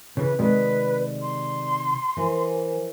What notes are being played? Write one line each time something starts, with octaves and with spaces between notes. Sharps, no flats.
C#3 E3 B4
C3 D#3 G#3 B4 D5
C6
E3 A#4 C5 G#5